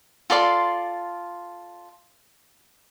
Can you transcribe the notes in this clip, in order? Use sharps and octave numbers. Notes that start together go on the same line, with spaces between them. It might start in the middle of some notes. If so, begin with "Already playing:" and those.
F4 A4 D5 C6